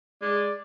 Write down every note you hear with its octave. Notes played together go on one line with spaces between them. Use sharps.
G#3 D5